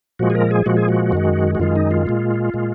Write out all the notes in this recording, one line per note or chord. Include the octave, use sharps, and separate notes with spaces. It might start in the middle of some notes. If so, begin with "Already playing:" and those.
A#2 F3 G#3 F#4
G#4
A#4
G#4
A#2 F3 G#3 F#4
G#4
F#4
F#2 D#3 G#3
F#4
F#2 D#3 G#3 F4
D#4
F4
A#2 G#3
A#2 G#3